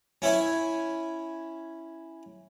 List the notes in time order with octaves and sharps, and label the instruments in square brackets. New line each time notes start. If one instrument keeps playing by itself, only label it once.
[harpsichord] C#4 E4 C#5 E5 G#5